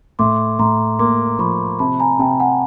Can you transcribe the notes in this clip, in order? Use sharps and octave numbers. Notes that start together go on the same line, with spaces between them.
A2 C6 D6
A2 A#5 C6
A#3 C6 D6
F3 B5 C#6
C3 A5 B5
G#5 A#5
C3 G5 A5
F#5 G#5